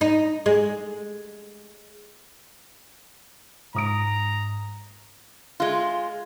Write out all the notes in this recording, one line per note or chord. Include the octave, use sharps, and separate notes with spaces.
D#4
G#3
G#2 A#5 D#6 D7
G#3 F4